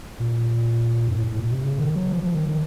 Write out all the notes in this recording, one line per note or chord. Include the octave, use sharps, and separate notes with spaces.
A#2
F#2
A2
A2
A#2
C3
C#3
D#3
F#3
F3
F3
D#3
D#3